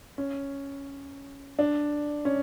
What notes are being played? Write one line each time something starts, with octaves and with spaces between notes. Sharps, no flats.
C#4
D4
C#4